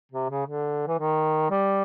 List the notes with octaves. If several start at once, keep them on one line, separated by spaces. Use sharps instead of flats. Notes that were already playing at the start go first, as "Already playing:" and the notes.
C3
C#3
D3
E3
D#3
G3